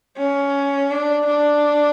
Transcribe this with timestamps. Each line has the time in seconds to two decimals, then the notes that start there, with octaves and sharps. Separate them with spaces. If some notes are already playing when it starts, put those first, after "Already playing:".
0.17 C#4
0.91 D4
1.26 D4